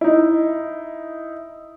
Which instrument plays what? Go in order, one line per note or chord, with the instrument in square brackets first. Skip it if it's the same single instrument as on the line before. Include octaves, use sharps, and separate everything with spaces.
[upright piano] D#4 E4